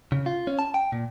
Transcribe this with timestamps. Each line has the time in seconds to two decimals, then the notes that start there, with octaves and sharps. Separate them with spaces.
0.12 C#3
0.26 F4
0.47 C#4
0.59 A5
0.74 G5
0.92 A#2